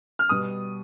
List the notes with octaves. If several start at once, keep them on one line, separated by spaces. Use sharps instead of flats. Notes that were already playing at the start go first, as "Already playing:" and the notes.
F6
B2 G3 D#6